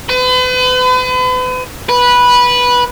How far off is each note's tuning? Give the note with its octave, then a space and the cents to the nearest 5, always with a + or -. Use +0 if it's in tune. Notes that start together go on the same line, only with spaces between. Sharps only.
B4 +40
B4 -10